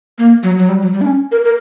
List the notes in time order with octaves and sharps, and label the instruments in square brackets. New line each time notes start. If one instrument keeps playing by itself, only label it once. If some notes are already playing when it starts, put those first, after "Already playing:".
[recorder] A#3
F#3
F#3
G3
F#3
G3
D4
C#4
A#4
A#4